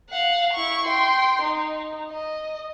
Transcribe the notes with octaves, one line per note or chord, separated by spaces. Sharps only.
F5 F#5
E4 C#6
G5 C6
D#4
D#5